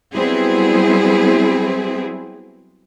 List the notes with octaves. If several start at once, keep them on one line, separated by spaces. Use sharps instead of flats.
F#3 G3 B3 C4 E4 G#4